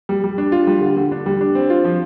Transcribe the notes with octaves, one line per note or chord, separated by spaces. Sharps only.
G3
G3
D4
F4
G3
D3
D3
D4
G3
D4
C4
F4
F3